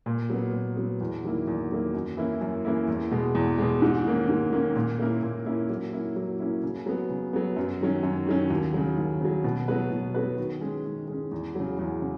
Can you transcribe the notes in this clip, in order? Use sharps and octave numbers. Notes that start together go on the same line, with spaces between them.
A#2
F#3 B3
A#2
F#3 B3
E2
D#3 F#3 A#3 E4
E2
D#3 F#3 A#3 E4
F#2
E3 A#3 C#4 E4
F#2
E3 A#3 C#4 E4
E2
B2 G#3
E2
B2 G#3
G#2
D#3 A#3 C#4
G#2
D#3 A#3 C#4
A#2
A#3 C#4 E4 A#4
A#2
A#3 C#4 E4 A#4
F#3
A#3 C#4 E4
F#3
A#3 C#4 E4
C#3
F#3 B3
C#3
F#3 B3
F#2
D#3 F#3 C#4
F#2
D#3 F#3 C#4
D#2
C#3 F#3
D#2
C#3 F#3
B2
F#3 B3 F#4 B4
B2
F#3 B3 F#4 B4
D#3
G#3 C#4
D#3
G#3 C#4
E2
C#3 F#3
E2
C#3